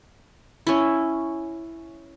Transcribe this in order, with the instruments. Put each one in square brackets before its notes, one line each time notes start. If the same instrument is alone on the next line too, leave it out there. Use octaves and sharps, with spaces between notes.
[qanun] C#4 E4